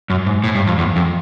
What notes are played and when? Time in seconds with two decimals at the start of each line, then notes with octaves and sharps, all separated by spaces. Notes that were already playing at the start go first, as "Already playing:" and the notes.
0.10 F#2
0.26 G#2
0.44 A2
0.55 G2
0.67 F2
0.78 E2
0.96 F2